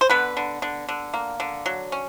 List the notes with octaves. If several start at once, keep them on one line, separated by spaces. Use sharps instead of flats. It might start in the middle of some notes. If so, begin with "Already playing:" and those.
C5
D3 B3 B4
D3
D3
D3
A#3
D3
F#3
C#4